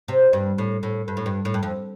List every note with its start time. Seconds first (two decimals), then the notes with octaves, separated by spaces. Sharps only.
0.08 C3
0.33 G2
0.58 A2
0.83 A2
1.08 G2
1.17 A2
1.26 G2
1.45 A2
1.54 G2
1.63 F2